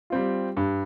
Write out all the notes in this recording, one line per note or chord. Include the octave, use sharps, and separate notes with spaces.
G3 C4 F4
G2